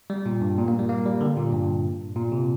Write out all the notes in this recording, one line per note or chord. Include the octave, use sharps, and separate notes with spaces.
G3
A#2
G2
A#2
A#3
G3
A#3
G3
D3
A#2
G2
A#2
C3